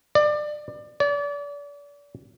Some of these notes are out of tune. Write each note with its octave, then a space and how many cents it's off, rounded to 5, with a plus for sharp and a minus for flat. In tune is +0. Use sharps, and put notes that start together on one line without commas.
D5 +25
D5 -35